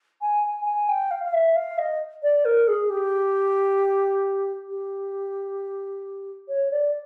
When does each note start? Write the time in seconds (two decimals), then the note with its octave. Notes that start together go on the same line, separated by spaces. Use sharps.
0.21 G#5
0.43 G#5
0.65 G#5
0.88 G5
1.10 F5
1.24 F5
1.33 E5
1.55 F5
1.78 D#5
2.22 D5
2.44 A#4
2.67 G#4
2.89 G4
4.69 G4
6.48 C#5
6.71 D5